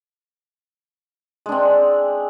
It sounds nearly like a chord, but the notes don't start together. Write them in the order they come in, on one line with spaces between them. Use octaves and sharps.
G#3 D4 C4